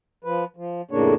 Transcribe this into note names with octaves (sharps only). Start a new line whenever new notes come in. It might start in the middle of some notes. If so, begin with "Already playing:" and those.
F3 B4
F3
F2 A2 C#3 A#3 D4 C#5